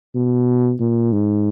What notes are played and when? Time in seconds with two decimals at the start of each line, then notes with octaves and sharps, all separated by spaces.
0.15 B2
0.80 A#2
1.12 G#2